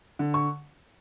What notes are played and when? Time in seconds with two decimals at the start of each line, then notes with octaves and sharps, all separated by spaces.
0.19 D3
0.34 C#6